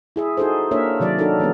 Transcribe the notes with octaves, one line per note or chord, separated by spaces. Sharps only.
E4 G#4 E5
D#4 F#4 G#4 A4 C5
A#3 D4 A#4 C#5 E5
C3 D#3 F#3 D5
D4 D#4 F#4 A4 A#4
E3 G#3 B3